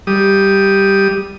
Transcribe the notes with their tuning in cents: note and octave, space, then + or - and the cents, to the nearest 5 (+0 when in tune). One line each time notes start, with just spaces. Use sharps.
G3 +0 D#6 +0